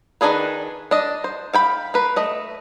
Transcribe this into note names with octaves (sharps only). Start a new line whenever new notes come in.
D#3 C4 D4 G#4 B4
D4 D#5
C5
F5 G5 B5
A#3 B4
A3 D#5